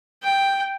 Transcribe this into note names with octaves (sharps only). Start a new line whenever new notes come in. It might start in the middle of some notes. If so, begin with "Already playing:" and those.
G5